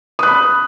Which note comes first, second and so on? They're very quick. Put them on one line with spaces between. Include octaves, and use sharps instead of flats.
D#6 F#6 B5